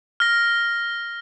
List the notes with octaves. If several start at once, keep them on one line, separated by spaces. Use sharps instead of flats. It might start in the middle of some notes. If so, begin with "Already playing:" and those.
F6 A#6